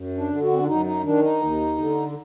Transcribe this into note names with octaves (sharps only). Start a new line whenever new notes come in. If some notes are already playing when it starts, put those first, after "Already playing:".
Already playing: F#2
D4
D3
F#4
C4
D4
F#2 D#4
D#4
D#3 D4
D#4
D#2
D3